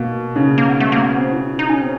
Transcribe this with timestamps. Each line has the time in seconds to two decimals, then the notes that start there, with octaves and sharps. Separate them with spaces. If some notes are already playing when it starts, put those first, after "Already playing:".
Already playing: B2 A#3
0.36 C#3
0.58 A#3
0.69 B3
0.80 A3
0.92 A#3
1.03 B3
1.18 C4
1.33 E4
1.59 D#4
1.70 C#4
1.81 C4